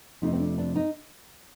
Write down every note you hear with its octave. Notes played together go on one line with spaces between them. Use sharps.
F2 C3 F3 A3 D#4
C4
D4
D4
D#4